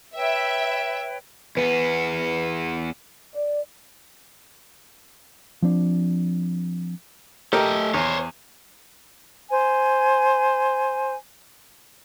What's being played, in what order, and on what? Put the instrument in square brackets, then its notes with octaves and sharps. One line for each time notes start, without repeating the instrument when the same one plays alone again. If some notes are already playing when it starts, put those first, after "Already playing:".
[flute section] B4 C#5 G5 [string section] E5
[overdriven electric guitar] E2 B3 [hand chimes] B4
[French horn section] D5
[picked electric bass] F3 C4 D4
[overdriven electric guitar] A3 D#5 [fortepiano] G4 A4 A#4
[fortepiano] E2 [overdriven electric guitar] C5 C#5
[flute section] C5 G#5